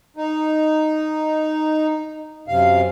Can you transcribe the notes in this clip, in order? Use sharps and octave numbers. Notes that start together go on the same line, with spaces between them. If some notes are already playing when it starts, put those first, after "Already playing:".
D#4
F#2 C3 F5